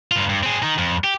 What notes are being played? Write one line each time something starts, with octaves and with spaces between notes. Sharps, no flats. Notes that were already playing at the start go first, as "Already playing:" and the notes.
G2 F4
G2
C4 G#4
D#3 D#4
F2
G4